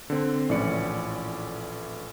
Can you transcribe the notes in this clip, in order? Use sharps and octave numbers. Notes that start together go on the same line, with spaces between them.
D3 C4
A#1 A2 E3 C#4 D5 C#7